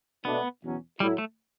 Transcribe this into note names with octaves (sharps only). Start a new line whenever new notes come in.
B2 A3 B3 D4
E2 B2 F#3 C#4
A2 F#3 G3 A3 E4
A3